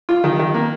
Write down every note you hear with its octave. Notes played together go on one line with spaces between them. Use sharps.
F4
D#3
D#3
A#3